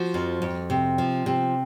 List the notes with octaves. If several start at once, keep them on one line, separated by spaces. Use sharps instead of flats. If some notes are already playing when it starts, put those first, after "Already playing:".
Already playing: F3 F#4
F2
F2
C3
F3
C3